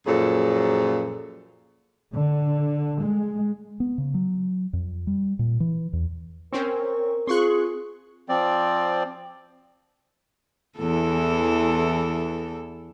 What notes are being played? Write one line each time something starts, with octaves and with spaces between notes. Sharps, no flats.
F#2 A#2 F3 F#3 G#4 A4
D3
G#3
B3
C#3
F#3
F2
G3
A#2
E3
E2
C4 C#4 A#4 C#6
C4 F4 G#4 C6 C#6 F#6
F3 C4 D5
E2 E3 A4